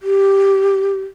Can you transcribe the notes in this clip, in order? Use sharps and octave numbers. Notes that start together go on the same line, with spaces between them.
G4